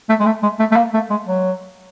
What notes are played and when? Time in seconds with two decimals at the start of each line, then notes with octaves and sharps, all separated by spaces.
0.09 A3
0.20 G#3
0.26 A3
0.43 G#3
0.59 A3
0.72 A3
0.76 A#3
0.94 A3
1.10 G#3
1.26 F#3